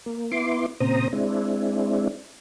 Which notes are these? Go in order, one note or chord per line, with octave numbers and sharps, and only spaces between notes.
A#3
B3 E4 C6 D6
A#2 C#3 C4 C5 A#5 D#6
G#3 C4 D4 E4